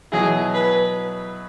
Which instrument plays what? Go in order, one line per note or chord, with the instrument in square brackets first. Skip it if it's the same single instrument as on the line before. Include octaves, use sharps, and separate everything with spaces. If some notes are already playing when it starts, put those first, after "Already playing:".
[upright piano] B2 F#3 E4 [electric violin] G#4
[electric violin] B4